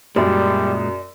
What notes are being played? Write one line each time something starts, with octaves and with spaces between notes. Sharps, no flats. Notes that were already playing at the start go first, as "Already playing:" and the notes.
F#2 A#2 G3 G#3 D5